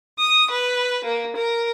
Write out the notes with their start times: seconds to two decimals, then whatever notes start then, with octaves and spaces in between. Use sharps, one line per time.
0.18 D#6
0.50 B4
1.04 A#3
1.36 A#4